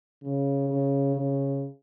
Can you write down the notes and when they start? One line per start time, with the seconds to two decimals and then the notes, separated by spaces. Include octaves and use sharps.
0.23 C#3
0.69 C#3
1.15 C#3